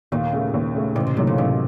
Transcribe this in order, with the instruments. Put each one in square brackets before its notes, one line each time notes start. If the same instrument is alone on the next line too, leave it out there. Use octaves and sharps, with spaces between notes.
[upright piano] D#2 [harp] A#2
[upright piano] C#3 A3
D#2
C#3 A3
[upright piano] A1 [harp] C3
[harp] C3
[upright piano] A2 F#3 A#3 D#4 [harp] C3
[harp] A#2 C#3
[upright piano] A1 [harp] C3